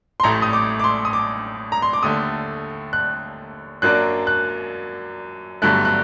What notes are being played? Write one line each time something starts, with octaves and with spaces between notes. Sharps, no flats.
C6
A1 A2 A3 A#5
D#6
D6
D6
C6
D#6
D6
A#5
C6
D6
D#2 D3 A3 D#6
F#6
F#2 F#3 A#3 D4 F#6
F#6
G1 G2 D3 F#3 A3 F#6
F#6